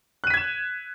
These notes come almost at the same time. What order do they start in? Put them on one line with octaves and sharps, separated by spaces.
F#6 D#7 B6 G#6 E7